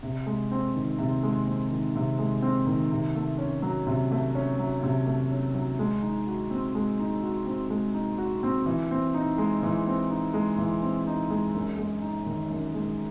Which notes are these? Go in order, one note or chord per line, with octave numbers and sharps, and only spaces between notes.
C3
G#3
C4
D#3
C3
G#3
C4
D#3
C3
G#3
C4
D#3
C3
A3
C#4
F#3
C3
A3
C#4
F#3
C3
A3
C#4
F#3
G#3
D#4
F#4
C4
G#3
D#4
F#4
C4
G#3
D#4
F#4
C4
E3
C4
D#4
G#3
E3
C4
D#4
G#3
E3
C4
D#4
G#3
F#2
G#3
D#4
D#3
F#2
G#3